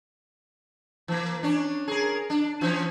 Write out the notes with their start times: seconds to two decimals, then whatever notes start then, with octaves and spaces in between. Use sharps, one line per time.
1.08 E3 A#3
1.43 C#4 D4
1.88 G#4 A#4
2.30 D4
2.61 E3 F3 C#4